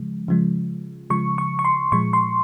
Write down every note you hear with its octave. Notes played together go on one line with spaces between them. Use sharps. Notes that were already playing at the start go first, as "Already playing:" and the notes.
Already playing: C#3 F3 G#3
C#3 F3 G#3
C#3 F3 G#3 C#6
C#6
C#6
C6
A#2 F3 G#3 C#6
C6